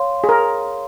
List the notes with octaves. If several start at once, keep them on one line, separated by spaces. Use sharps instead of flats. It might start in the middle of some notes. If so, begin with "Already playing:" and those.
Already playing: C#5 F5 C6
G#4
A#4